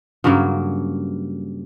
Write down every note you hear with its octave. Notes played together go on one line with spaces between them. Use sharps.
G2 C#3 F#3 A#3